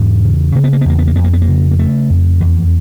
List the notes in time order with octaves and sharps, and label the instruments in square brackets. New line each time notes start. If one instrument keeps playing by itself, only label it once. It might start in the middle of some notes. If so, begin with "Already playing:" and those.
Already playing: [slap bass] E2 G#2 B3
C#3
C#3 A#3
B3
A#3
B3
E2 A#3
B3
A#3
F2 B3
A#3
B3
A#3
C#3
A#3
C#3 A3
F2
E2